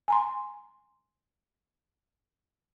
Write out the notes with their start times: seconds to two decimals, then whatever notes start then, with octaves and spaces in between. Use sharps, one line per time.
0.08 G#5 A#5 C6